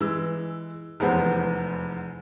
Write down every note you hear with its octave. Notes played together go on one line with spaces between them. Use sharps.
E3 G#3 E6
F1 E2 G#3 B3 C5